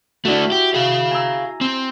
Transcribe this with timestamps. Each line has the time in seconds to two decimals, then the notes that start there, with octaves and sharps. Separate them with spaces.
0.25 A3 D4 E4 F#4
0.52 G4
0.74 G#4 F5
1.11 G#5 A#5 E6
1.61 C4